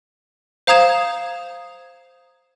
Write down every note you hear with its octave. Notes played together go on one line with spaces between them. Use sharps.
C5 F5 A#5 D#6 G#6 E7